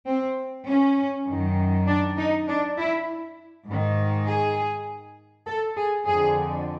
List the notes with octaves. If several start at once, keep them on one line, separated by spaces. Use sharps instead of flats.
C4
C#4
F#2 D#3
D4
D#4
D4
E4
G#2 D#3
G#4
A4
G#4
F2 D3 G#4